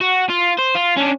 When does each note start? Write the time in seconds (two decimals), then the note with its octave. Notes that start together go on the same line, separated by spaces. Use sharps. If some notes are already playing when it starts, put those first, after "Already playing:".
0.01 F#4
0.30 F4
0.59 C5
0.76 F4
0.98 C#4 D4